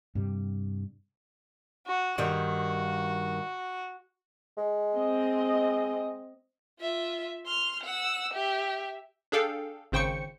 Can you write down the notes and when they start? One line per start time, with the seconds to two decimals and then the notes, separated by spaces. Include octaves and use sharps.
0.15 G2 C3 G3
1.87 F#4
2.18 G2 D#3 G3 F#4
4.57 G#3
4.97 C4 D#5
6.79 F4 E5
7.46 C6 F6
7.83 F#5 E6
8.33 G4 E5
9.32 D4 G#4 A4 F5 G5
9.92 G#1 C#3 C5 G5 C#6 C#7